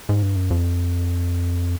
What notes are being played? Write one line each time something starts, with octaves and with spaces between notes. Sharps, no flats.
G#2
G2
F#2
F2